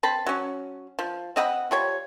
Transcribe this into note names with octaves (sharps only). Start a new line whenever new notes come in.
C4 A5 B5
F#3 C#4
F3
C4 D#5 F#5 B5
F3 G3 C#5